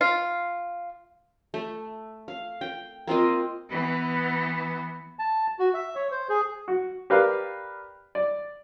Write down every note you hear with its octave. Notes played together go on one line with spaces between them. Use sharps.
F4
A3
F5
G5
A#3 C4 F4 D#5
E3 B3
A5
F#4
E5
C#5
C5
G#4
F#4
G4 A#4 B4 D5 F5
D5